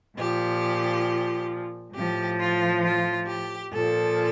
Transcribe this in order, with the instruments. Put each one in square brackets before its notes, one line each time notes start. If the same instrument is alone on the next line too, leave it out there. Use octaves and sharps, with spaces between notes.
[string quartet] A#2 F3 G4
A2 F3 G4
F4
F4
G4
A#2 F3 A4